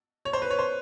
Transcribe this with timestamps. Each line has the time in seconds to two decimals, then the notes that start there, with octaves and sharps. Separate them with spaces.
0.25 C#5
0.33 C5
0.42 B4
0.51 C#5
0.59 C5